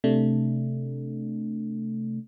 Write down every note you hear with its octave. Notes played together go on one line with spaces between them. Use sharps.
C3 A3 D4